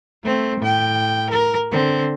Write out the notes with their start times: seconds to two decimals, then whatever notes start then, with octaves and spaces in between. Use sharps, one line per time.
0.23 A3 C4
0.59 A2 G5
1.30 A#4
1.71 D3 C4